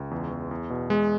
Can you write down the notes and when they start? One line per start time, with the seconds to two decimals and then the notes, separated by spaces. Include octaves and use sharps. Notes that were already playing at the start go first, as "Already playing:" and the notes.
Already playing: C#2
0.11 E2
0.31 E2
0.51 E2
0.70 B2
0.90 E2 G#3